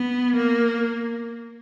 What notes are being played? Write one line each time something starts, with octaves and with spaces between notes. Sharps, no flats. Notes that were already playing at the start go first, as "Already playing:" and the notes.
Already playing: B3
A#3